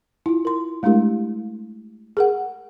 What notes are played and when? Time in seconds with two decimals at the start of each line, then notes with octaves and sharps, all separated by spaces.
0.26 E4 F4
0.45 A#4 C6
0.83 G#3 A3 D4 E4 G4 A#4
2.17 G#4 A#4 F#5